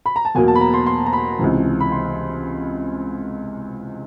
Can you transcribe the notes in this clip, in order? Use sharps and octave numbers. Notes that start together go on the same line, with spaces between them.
B5
A#5
A5
E2 B2 F#3 A#3 G#5
A5
B5
A#5
C6
C6
A#5
B5
C#2 C3 E3
B5
C6